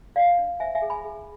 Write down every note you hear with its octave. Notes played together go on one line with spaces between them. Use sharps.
D4 D5 F5
D4
C5 E5 G#5
E5 G#5
G#4
G#5 B5
G#4